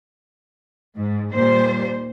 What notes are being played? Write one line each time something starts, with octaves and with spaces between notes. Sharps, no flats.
G#2
D#2 A#2 G3 C5